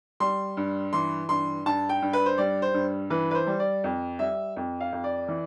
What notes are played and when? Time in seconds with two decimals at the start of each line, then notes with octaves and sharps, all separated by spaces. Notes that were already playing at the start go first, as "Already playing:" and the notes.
0.20 G3 C6
0.57 G2
0.93 E3 C6
1.29 G2 C6
1.66 G2 A5
1.89 G5
2.02 G2
2.13 B4
2.26 C5
2.38 G3 D5
2.62 C5
2.74 G2
3.10 E3 B4
3.31 B4
3.35 C5
3.47 G3
3.59 D5
3.84 F2
4.19 G3 E5
4.56 F2
4.81 F5
4.92 F2
5.04 D5
5.28 E3